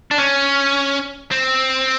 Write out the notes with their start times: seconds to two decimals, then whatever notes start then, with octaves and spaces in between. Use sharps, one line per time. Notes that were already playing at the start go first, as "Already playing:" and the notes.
0.11 D4
0.18 C#4
1.31 C4